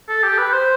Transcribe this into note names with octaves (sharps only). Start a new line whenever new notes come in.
A4
G4
B4
C5